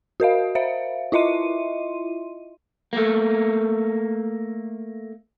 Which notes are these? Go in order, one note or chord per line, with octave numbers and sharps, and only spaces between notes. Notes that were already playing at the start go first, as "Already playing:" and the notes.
F#4 A#4 D#5 F5
C5 E5 F5
E4 F4 D#5 E5 C6 D#7
A3 A#3